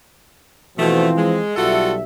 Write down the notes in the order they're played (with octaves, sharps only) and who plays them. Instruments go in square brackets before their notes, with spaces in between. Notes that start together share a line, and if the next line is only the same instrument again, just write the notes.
[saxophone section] B2 A3 [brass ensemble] E3 F3 C4
[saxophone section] G#3
[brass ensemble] B1 G3 E5 [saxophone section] F4 F#4 A4